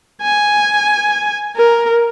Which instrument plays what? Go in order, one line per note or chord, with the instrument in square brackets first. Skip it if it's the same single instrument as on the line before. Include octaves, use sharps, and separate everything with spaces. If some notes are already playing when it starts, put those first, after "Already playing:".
[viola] G#5
A#4